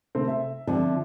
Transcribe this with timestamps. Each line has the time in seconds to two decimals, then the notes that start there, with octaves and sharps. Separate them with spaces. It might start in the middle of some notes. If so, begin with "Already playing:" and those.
0.15 C3 A3 C4
0.28 E5
0.67 D3 F3 C4